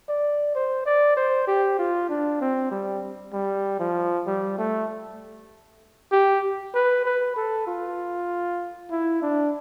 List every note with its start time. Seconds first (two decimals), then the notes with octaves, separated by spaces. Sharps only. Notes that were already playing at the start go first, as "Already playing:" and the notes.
0.08 D5
0.55 C5
0.86 D5
1.17 C5
1.47 G4
1.79 F4
2.09 D4
2.41 C4
2.71 G3
3.33 G3
3.79 F3
4.27 G3
4.58 A3
6.12 G4
6.74 B4
7.05 B4
7.36 A4
7.67 F4
8.90 E4
9.22 D4